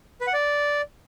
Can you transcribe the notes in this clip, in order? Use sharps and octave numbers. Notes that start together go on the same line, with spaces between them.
B4
F#5
D5